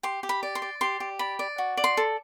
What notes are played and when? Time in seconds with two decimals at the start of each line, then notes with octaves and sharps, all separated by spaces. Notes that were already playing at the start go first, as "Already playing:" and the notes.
0.03 G4 C6
0.23 G4
0.29 B5
0.43 D5
0.55 C6
0.62 D5
0.81 G4 C6
1.00 G4
1.19 D5 B5
1.39 D5
1.58 F#4
1.77 D5
1.84 C6
1.97 A4